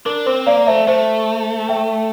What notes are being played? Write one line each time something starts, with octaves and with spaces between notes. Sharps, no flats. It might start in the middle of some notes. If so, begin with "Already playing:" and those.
D4 A#4
C4 C5
A#3 D5 F5
D5
A3 C5 E5
A3 C5 E5
E5 G5